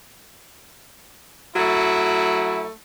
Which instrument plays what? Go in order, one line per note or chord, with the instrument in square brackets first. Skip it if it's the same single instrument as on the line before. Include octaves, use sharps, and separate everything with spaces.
[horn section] F#3 A3 E4